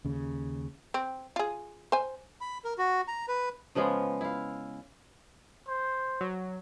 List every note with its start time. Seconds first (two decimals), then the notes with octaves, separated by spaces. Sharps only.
0.05 D#2 C#3
0.94 C4
1.36 F4 G#4
1.92 C5 G#5
2.41 B5
2.64 A#4
2.78 F#4
3.08 A#5
3.28 B4
3.75 C#3 F3 G#3 B3
4.21 E4 F5
5.68 C5
6.21 F#3